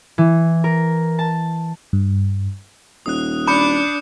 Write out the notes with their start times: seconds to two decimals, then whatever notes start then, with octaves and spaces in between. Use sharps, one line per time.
0.18 E3
0.64 A#4
1.19 A5
1.93 G2
3.06 D#1 D#6 F#6
3.47 D4 B5 D6 G6 C#7